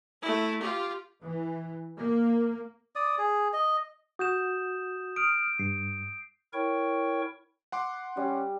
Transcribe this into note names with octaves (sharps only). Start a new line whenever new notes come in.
A3 E4
F4 G4
E3
A#3
D5 D#6
G#4
D#5
F#4 D#6 G6 E7
D#6 F6 D7
G2 C7
E4 A#4 C#5 G5 C#6
F#5 C6 D6
G3 C#4